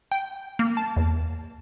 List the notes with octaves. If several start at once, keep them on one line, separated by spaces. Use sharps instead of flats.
G5
A#3
A5
E2